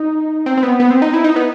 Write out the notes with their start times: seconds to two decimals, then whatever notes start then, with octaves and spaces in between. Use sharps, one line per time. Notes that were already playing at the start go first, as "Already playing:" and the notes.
Already playing: D#4
0.46 C4
0.57 C4
0.63 B3
0.80 B3
0.91 C4
1.02 D#4
1.14 E4
1.24 D#4
1.36 B3